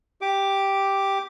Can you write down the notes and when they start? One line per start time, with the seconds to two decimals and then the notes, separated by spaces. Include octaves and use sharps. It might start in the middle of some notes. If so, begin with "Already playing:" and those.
0.21 G4 D6